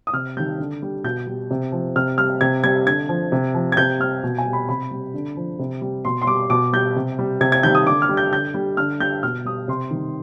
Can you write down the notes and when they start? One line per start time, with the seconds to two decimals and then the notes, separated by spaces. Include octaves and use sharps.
0.07 D#6
0.13 C3 F6
0.37 D#3 G3 G6
0.59 D3
0.82 G3
1.04 B2 G6
1.27 G3
1.51 C3
1.72 F3
1.96 C3 F6
2.18 G3 F6
2.41 C3 G#6
2.64 G3 G#6
2.86 D3 G#6
3.09 F3
3.32 C3
3.55 F3
3.72 G#6
3.77 C3 G6
4.00 G3 F6
4.23 B2
4.38 G#5
4.45 G3
4.53 B5
4.69 C3 B5
4.91 G3
5.14 D3
5.37 F3
5.59 C3
5.81 G3
6.05 B2 C6
6.22 C6
6.27 G3 D6
6.50 B2 D6
6.73 G3 G6
6.96 C3
7.19 G3
7.41 C3 G#6
7.52 G#6
7.63 D#3 G3 G6
7.75 D#6
7.87 D3 D6
8.02 F6
8.09 G3
8.17 G6
8.32 D3 G6
8.54 G3
8.77 D3 F6
9.00 G3 G6
9.23 B2 F6
9.45 G3 D#6
9.68 C3 C6
9.91 D#3 G3